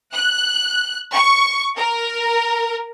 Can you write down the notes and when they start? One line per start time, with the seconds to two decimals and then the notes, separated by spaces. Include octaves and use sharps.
0.15 F#6
1.14 C#6
1.77 A#4